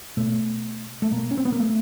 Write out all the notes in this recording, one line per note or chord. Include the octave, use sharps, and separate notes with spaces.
B2 A3
A3
B2 A#3
C#4
C4
B3
A#3
A3